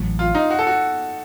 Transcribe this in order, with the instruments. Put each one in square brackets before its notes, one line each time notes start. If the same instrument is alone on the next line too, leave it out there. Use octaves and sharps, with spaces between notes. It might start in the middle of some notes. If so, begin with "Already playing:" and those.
Already playing: [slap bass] A1 A2 F#3
[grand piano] F4
D#4
F#4
A4
F#4